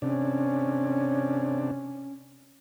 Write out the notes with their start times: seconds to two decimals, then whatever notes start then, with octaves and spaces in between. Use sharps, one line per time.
0.02 C3 C#4 D4